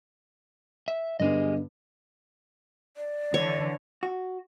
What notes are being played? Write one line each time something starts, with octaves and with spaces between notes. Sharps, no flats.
E5
G2 D3 B3 G4 G#4 D#5
D5
D3 E3 C#5
F#4